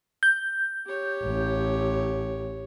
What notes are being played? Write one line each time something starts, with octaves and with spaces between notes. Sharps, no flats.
G6
G4 C#5
A1